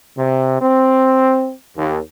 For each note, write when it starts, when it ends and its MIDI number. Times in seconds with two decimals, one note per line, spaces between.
0.17 0.59 48
0.60 1.52 60
1.76 1.99 39